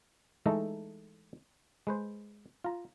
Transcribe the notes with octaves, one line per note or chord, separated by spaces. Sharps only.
E3 G#3 A3 D#4 A4 A#5
G#3 B4 C5
F4 A#5